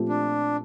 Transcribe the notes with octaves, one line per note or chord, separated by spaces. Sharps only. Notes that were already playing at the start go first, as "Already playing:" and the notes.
Already playing: A#2 F3 A3 C4 G4
D4